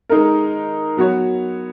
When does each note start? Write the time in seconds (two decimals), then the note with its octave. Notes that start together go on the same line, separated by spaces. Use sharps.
0.09 G#3 D#4 A#4
0.97 F#3 B3 F#4 C#5